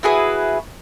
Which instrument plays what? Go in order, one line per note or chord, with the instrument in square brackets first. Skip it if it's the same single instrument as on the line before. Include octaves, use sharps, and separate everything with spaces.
[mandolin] E4 F#4 G#4 B4